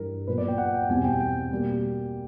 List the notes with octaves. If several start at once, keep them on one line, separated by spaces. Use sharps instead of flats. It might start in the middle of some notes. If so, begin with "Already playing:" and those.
Already playing: G2 E3 G3 A#4
A#2 F#3 B3 B4
D5
G5
F#5
G5
E2 B2 G3 C4 G#5
G5
G5
B2 G3 A#3